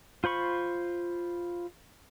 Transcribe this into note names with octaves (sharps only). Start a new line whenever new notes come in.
F4 C5 B5 C#6